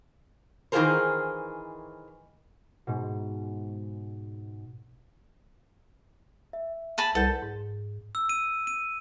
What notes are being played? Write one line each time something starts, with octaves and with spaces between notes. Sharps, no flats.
D#3 E3 F4 G#4 A#4 C5
G#2 B2
E5
G#5 A5 B5
C2 A4 B4 F#5 G6
G#2
E6
D#7
D#7